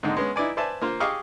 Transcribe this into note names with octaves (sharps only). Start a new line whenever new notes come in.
G#2 D3 G#3 C4 D#4
G#3 B3 C#4
D#4 E4 B4 D5 G#5
B4 C5 D5 E5 G#5 A5
A#3 F4 C5
G4 G#4 D#5 F5 C#6 D6